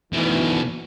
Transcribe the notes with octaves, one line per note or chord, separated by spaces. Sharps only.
D2 B2 D#3 E3